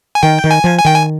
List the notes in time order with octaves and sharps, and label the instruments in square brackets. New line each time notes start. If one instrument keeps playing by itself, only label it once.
[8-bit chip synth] G#5
[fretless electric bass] D#3 [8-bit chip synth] G5
[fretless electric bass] D#3
[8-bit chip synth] G#5
[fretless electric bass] F3
[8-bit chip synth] G#5
[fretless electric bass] D#3 [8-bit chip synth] G5
[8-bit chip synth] G#5